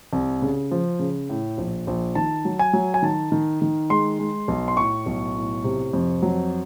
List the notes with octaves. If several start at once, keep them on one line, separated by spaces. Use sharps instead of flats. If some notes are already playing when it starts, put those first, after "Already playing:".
C2
C#3
F3
C#3
A2
A#1
A#1
D#3 A5
F#3
G#5
F#3
G#5
D#3 A5
D#3
D#3
G#3 C6
G#3
B1
C6
A2 C#6
B1
A2
C3
F2
F#3